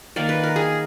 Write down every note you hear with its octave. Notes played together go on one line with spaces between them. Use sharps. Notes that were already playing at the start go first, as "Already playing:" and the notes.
D#3 A#3 D5
B4
A#4
G#4